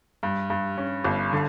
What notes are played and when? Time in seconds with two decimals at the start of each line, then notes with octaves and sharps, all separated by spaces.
0.23 G2
0.50 G2
0.78 C#4
1.04 G1
1.33 D3